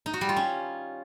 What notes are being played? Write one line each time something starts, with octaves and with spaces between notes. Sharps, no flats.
D#4
F#4
G3
F4
C#4